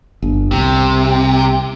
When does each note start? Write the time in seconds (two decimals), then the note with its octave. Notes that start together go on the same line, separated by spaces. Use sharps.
0.22 G1
0.51 C2 C3